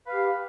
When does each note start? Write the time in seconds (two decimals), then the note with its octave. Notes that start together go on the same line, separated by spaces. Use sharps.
0.06 B4
0.09 F5
0.11 G4